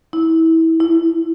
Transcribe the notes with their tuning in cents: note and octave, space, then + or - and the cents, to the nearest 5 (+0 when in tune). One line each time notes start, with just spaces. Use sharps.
E4 -25
E4 +20